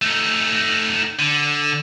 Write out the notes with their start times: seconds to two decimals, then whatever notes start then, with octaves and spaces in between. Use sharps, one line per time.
0.02 A3 D#4
1.19 D3